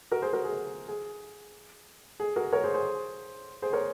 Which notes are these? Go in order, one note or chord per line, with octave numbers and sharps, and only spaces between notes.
F#4 A#4
G#4 C5
F#4 A#4
G#4
G#4
G#4
F#4 A#4
A#4 C#5
G#4 C5
G#4 C5
G#4 C5
A#4 C#5